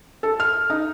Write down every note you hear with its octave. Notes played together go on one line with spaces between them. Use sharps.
A4
F6
D#4